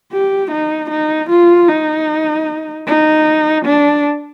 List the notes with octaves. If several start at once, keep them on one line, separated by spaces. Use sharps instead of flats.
G4
D#4
D#4
F4
D#4
D#4
D4